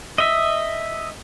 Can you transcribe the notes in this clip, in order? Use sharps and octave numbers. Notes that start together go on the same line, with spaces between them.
D#5 E5